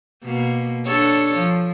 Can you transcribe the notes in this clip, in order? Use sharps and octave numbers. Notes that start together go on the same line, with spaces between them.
B2 A#3
D4 A4 C#5
F3